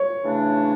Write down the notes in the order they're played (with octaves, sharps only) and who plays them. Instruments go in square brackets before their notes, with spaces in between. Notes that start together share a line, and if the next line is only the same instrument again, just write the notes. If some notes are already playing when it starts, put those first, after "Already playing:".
Already playing: [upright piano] C#5
[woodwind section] C#3 E3 A3 D4